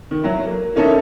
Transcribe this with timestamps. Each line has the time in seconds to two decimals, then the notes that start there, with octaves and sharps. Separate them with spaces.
0.11 D#3
0.23 F#3 E4
0.46 A#3
0.75 E3 A#3 C#4 D#4 A4 E5